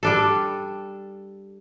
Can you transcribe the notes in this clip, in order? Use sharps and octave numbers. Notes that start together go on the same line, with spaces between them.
G3 D4 A4